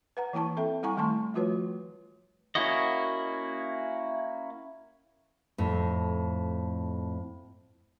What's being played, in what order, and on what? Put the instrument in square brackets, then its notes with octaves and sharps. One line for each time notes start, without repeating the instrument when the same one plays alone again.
[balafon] B4 F#5 A#5
E3 A#3 E4 A5 C#6
C4 A4 E5 G5
G3 E4 F#5 G#5 A#5 C#6
D#3 G3 A3 A5 C6 C#6
F3 A3 F4 F#4 B4 C#5
[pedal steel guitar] A#3 C#4 E4 F#4 D#5
[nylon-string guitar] F2 A2